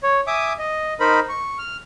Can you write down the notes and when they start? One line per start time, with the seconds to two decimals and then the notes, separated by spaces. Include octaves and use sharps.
0.03 C#5
0.27 E5 G#5 D6 D#6
0.58 D#5
1.00 D#4 A#4 C5 B5
1.29 C#6
1.58 F6